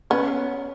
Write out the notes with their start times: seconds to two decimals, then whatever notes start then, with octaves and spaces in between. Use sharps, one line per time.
0.10 B3 C#4 C#5